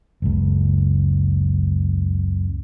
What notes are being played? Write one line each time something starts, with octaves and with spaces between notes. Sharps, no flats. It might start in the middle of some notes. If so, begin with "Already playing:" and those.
F#1 C#2